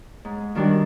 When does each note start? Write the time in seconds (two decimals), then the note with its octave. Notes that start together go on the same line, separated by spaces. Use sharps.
0.25 G#2
0.55 D#3 G3 D4 F#4 A#4